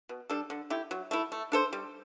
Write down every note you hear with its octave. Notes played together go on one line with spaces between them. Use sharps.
B2
G3 D4 A4
D3
A3 E4 G4
F#3
A3 E4
A3
D4 A4 C5
G3